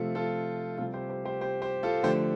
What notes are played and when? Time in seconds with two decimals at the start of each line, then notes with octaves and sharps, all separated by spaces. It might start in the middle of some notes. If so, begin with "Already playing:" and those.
Already playing: C3 F3 A3 F4 A4
0.15 F4 A4
0.78 C3 G3 F4 A4
0.94 G4 C5
1.09 G4 C5
1.25 G4 C5
1.41 G4 C5
1.62 G4 C5
1.83 F4 A4
2.03 D3 F3 A3 G4 C5